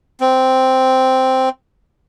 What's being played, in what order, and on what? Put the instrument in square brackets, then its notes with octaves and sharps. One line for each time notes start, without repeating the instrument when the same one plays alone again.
[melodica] C4